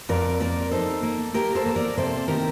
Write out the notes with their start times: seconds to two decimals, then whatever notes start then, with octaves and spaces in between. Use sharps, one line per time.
0.09 F2 A#4 D5
0.40 A#3 A#4 D5
0.71 D#4 A4 C5
1.03 A#3
1.34 A#3 G4 A#4
1.55 A4 C5
1.66 A#3
1.76 A#4 D5
1.97 C3 A4 C5
2.28 D#3 G4 A#4